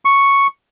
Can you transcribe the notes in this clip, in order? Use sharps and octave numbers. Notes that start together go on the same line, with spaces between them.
C#6